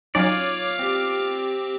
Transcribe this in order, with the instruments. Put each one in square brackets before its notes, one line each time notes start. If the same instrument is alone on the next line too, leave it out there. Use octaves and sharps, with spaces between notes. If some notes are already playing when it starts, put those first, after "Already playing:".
[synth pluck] F#3 C#4 D#4 [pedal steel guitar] F4 D5 [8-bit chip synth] C#5 [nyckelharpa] F5 D6
[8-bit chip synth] C4 G4